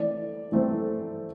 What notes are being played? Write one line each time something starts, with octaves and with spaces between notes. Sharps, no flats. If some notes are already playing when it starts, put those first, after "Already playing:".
Already playing: E3 A3 C4 D5
E3 A3 C4